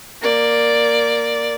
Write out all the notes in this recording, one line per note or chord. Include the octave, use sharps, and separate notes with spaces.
A#3 D5